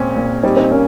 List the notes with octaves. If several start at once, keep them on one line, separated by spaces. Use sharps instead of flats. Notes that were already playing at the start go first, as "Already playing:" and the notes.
Already playing: A#2 G#3 C4 C#4
A#2
G3 C4 D#4
C4 D#4
A#3 C#4